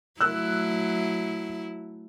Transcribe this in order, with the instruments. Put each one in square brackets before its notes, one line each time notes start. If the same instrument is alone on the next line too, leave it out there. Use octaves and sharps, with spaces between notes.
[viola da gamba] F#3 A3 E4 [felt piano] E6 F#6